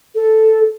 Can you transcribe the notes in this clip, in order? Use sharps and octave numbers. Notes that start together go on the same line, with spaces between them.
A4